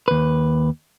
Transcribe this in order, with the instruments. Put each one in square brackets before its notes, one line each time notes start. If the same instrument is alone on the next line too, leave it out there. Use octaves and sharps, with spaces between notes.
[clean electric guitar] D#2 B4